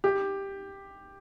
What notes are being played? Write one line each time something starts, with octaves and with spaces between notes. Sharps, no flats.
G4